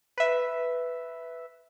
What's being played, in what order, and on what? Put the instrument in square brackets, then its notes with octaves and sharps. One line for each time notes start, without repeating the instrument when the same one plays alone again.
[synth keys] B4 E5